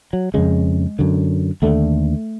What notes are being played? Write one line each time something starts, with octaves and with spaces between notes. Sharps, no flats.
F#3
F2 C#3 G#3
F#2 D3
D#2 D3 A3